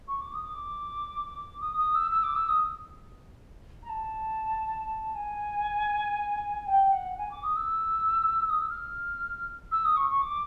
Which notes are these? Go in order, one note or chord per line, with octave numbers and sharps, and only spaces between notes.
C#6
D6
D#6
D6
D#6
D#6
E6
E6
D6
E6
D#6
A#5
A5
G#5
G5
F#5
G#5
D6
D#6
E6
D#6
E6
F6
E6
D#6
C#6
C#6
D6